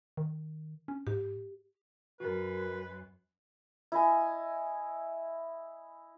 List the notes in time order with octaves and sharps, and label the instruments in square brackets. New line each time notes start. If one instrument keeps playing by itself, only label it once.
[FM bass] D#3
C#4
[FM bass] G#2 [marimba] G4
[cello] F#2 [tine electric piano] F#4 A#4 [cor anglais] B4
[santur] E4 D#5 G#5